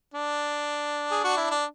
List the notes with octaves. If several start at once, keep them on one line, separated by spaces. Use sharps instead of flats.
D4
G#4
F#4
E4
D4